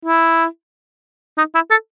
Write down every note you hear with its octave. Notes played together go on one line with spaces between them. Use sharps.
E4
D#4
E4
A4